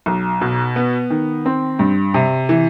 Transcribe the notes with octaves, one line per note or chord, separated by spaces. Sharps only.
B1
B2
B3
D#3
C4
G2
C3
E3